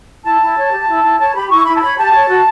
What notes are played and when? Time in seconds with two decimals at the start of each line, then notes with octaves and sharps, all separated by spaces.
0.24 E4 A5
0.41 E4
0.56 C#5
0.71 G4
0.87 E4
1.03 E4
1.19 C#5 A5
1.34 G4 B5
1.50 E4 C#6
1.65 E4 B5
1.75 A5
1.81 C#5 B5
1.97 G4 A5
2.13 C#5
2.28 F#4